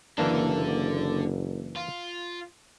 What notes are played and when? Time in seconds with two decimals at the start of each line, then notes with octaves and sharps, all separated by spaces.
0.18 F#1 D3 E3 A#3 D4 A4
1.76 F4